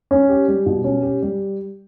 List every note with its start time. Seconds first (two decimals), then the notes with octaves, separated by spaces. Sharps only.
0.11 C#4
0.29 G4
0.48 G3
0.66 B2
0.84 C#4
1.03 G4
1.22 G3